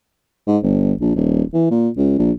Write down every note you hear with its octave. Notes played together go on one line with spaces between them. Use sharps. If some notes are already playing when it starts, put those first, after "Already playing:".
G#2
G1
A#1
D#1
E3
A#2
C#2
A#1